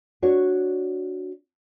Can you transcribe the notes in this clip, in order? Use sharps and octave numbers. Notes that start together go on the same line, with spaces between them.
D4 F#4 C#5